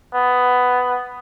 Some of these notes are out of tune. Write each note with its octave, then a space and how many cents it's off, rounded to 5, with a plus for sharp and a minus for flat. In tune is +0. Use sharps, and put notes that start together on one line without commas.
B3 +10